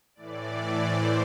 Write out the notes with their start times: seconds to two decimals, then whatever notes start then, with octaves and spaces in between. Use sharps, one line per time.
0.15 A2 E3 D5
0.83 C5